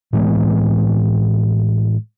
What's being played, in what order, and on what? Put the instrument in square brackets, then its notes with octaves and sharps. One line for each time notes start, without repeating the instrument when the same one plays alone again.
[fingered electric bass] A2 E3 G#3 B3